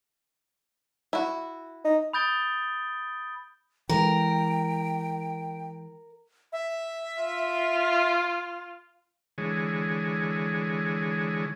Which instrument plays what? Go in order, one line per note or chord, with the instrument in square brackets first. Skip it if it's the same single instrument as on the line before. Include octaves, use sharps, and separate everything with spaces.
[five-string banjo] E4 F#4
[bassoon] D#4
[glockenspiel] B5 D#6 G6 A6 D7 G7
[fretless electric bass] E3 G#3 [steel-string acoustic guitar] A#4 [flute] G5
[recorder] E5
[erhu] F4
[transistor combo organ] D3 E3 G#3 G#4 C#5